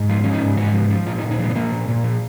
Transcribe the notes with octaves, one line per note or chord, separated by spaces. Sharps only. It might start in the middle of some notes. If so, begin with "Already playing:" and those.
Already playing: G#2
F3 F4
F3 C#4
D#4
G#2
G#2 F#4
F3
F3
A#2 F4
D#4
A#2
D#4
F3 G#3
B3
F3 A#3
A#2
A#2
F3